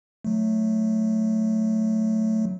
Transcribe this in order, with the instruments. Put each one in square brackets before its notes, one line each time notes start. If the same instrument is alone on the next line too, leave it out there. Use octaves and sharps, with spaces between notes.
[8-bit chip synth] F#3 A3